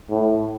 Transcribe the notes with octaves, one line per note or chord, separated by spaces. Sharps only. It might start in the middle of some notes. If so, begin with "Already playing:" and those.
A2